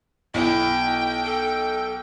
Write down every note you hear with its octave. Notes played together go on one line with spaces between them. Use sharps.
B1 E4 G5
A4